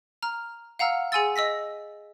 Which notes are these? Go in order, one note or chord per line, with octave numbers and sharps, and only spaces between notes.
A#5 F6
F5 F#5 A#5 E6 F6
G#4 F#5 G#5 C6 E6 A6
D#5 E6 A#6 B6